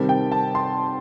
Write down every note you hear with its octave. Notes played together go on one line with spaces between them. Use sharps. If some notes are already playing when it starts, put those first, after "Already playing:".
Already playing: C3 D#3 G3 C4 A5
G5
A5
C6